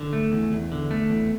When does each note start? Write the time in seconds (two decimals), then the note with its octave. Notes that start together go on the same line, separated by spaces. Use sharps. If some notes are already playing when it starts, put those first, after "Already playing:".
Already playing: D3
0.13 A3
0.32 E2
0.52 E2
0.72 D3
0.91 A3
1.10 E2